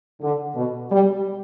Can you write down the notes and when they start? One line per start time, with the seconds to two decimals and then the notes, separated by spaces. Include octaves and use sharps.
0.22 D3
0.56 B2
0.91 G3